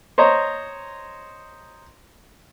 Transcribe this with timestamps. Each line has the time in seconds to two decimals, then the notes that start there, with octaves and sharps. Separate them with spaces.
0.18 C5 C#5 D#5 A#5